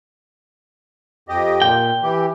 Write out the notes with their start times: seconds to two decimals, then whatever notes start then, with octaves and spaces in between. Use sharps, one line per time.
1.29 F2 G4 D#5
1.62 A#2 G5
2.03 E3 G4